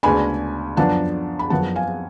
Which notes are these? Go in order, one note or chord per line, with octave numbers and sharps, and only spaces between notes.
D2 C#3 G#3 B3 D4 G#5 B5
F#2 F3 B3 D4 F#5 A5
B5
F#2 F3 B3 F#5 A5
F5 G#5